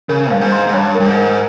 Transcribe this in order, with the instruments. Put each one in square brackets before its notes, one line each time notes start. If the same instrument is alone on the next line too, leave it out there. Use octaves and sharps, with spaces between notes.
[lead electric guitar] C#3 [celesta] A#4
[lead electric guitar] G2 [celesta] F5
[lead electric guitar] G#2
[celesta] C6
[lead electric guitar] G#2
[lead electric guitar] G2 [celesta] C#5
[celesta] A#4
[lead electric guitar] G2
G#2
[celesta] A#4